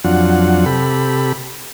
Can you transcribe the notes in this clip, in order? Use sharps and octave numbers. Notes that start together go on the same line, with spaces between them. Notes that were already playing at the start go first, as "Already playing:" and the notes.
F2 F#3 D4 F4 F#5
C3 G4 A4 B5